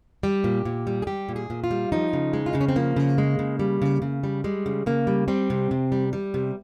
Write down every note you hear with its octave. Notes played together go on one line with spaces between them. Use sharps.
G3 G4
A#2
A#2
G3
G#4
G3 G4
A#2
G#4
A#2
F4
G3
F3 D#4
C#3
G#3
F4
C#3 D#4
C#4
C4
F3 A#3
C#3
G#3
C#3
G3
C#3
C#3
G3
G3 G#3
C#3
C#3 A#3
G3
G3 C4
C3
C3
G3
G3
C3